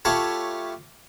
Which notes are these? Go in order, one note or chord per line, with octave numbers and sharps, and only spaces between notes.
A3 F4 G4 C#5 A5 B5